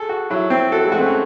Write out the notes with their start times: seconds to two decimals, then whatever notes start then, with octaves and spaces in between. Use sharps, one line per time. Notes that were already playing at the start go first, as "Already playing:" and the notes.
Already playing: G#4 A4
0.09 F#4
0.30 F#3 E4
0.50 C4
0.72 F#4 A4
0.85 G#3
0.92 A3 F#4
0.99 C4
1.06 C#4